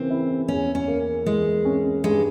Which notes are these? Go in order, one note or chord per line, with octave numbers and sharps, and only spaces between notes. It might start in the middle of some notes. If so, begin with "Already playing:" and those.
Already playing: C#3 E3 A#3 C4
E4
E2 C#4
C#4
A#3
E3 G#3
C#4
G2 G#3